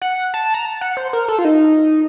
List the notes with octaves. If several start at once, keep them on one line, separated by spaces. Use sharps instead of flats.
F#5
A5
A#5
A5
F#5
C5
A#4
A4
F4
D#4